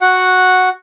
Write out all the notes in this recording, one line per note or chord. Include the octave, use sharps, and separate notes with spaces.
F#4 F#5